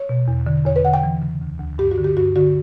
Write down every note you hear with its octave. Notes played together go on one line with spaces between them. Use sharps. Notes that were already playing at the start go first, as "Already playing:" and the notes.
Already playing: C#5
B2
E2
D3
E2 C#5
B4
D3 F#5
G5
E3
C#3
D2
D2
G2 G4
F#4
D3
G4
G2 F#4
D3 F#4